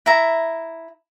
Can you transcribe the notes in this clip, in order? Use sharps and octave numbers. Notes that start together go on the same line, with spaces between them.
E4 E5 A#5